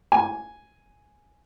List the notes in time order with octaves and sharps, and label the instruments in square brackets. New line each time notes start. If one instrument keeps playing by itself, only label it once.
[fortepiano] G#5